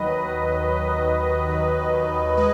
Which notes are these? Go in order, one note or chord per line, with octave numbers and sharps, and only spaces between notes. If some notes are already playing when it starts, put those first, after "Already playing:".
Already playing: D#2 D#3 F#3 B4 D#5
D#2
F#3
D#2
D#3
D#2
G#3 B4 D#5